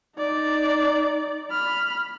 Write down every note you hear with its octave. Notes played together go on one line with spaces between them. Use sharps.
D#4 D5
B5 F6